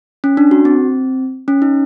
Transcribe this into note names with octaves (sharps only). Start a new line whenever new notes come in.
C#4
D4
F#4
C4
C#4
D#4